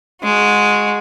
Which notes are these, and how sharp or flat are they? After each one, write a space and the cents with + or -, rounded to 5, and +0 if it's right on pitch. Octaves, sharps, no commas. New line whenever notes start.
G#3 +0 F#4 -25